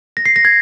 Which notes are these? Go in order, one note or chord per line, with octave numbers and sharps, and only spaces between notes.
A#6
C7
A#6
G#6